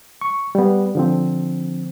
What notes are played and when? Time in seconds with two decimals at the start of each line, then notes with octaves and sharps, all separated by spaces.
0.21 C#6
0.55 G3 B3
0.95 D3 F3 C4